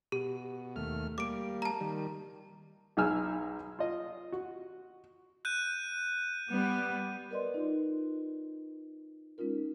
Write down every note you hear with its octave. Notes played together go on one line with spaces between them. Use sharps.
B2 G4
D#2 A3 F6
G3 A#3 D6 D7
A5 A#5
D#3 G3
B1 D#4 G#4 G#5 E6 F6
F4 D#5
F#4
F#6 G6 D#7
G3 B3
A#4 B4 D5 D#5 C6
D#4 F4 A#4
G#3 C#4 D#4 F4 A#4